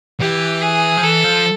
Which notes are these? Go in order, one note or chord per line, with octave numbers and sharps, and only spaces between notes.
E3 G4
G#4
F3
E3 A4
F3